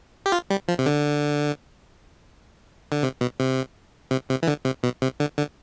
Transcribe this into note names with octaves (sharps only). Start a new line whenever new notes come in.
G4
F4
G3
F3
C3
D3
D3
C3
B2
C3
C3
C3
E3
D3
C3
B2
C3
D3
D3